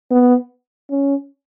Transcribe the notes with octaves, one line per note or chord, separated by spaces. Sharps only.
B3
C#4